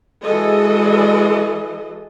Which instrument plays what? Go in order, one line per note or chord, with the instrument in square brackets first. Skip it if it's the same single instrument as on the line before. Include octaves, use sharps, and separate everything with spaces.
[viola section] E3 G#3 F#4 G#4 A4 D#5